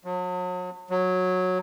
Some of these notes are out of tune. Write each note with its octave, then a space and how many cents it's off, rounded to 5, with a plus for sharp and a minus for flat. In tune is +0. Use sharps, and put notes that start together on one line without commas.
F#3 -40
F#3 -10